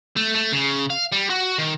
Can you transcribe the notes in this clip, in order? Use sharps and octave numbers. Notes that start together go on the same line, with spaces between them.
A3
A3
C#3
F5
G3
F#4
D#3